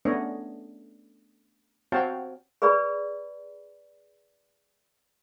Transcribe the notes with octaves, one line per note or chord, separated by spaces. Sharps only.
A3 B3 C#4 D4 C#5 D#5
C4 F#4 C#5 F5 G5 A5
G#4 B4 D5 B5